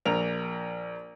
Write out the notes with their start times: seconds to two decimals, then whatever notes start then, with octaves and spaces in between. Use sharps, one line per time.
0.05 A#1 A#3 A#4 F7